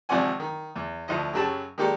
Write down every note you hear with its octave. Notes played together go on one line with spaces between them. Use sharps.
G#1 C3 F3 D5 F#5 G#5
D#3
E2
D2 F3 E4 D#5
F#2 C#3 F#3 G4 A5
D#3 G#3 A#3 G4 A4 D5